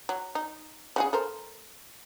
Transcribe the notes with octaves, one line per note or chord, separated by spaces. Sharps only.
F#3
D#4
C#3 F#4 G#4
A4 A#4 C5